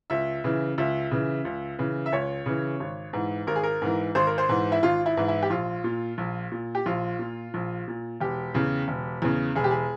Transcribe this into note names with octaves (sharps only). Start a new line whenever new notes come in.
C#2 E5
C#3 E3
C#2 E5
C#3 E3
C#2
C#3 E3
E5
C#2 C#5
C#3 E3
G#1
G#2 E3
G#1 A#4
G#4
A#4
G#2 E3
G#1 C5
A#4
C5
G#2 E3
E4
G#1 F4
E4
G#2 E3
E4
G4
A#1 F4
A#2
A#1
A#2
G4
A#1 F4
A#2
A#1
A#2
E1 G4
E2 C#3
E1
E2 C#3
E1 G#4
G4
G#4